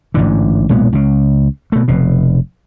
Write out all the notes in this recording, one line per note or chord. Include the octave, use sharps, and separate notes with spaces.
A1 G#2 D3
B1 A#2 G#3 B3
C#2 C#3
B2 A3
F1 B2